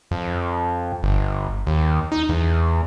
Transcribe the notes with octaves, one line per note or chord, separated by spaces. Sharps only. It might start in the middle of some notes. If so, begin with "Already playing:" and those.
F2
G1
D#2
D#4
E2